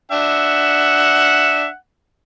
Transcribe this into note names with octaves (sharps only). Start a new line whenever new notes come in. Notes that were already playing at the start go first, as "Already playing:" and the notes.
D4 E5 F#5